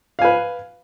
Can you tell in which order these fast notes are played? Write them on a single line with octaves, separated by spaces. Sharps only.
F5 G#5 B4